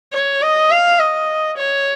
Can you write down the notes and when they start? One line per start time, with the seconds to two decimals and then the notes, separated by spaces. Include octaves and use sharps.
0.13 C#5
0.42 D#5
0.71 F5
0.99 D#5
1.58 C#5